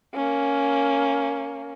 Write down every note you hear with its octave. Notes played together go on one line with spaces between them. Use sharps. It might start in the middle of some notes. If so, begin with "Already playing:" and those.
A#3 C#4